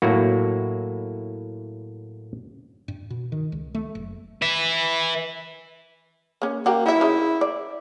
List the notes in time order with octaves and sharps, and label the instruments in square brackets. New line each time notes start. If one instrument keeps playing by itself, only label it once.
[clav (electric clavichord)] A2 F#3 A#3 E4 F#4
[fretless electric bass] G2
B2
D#3
C#2
A3
F#1
[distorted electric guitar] B4 E5
[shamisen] A#3 C#4
[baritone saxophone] A#3 [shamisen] F#4 G4
[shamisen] F#3 E5 [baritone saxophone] E4
[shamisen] C#3 C#4 D#4
D5